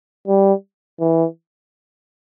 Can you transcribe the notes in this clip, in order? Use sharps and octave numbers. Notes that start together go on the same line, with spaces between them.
G3
E3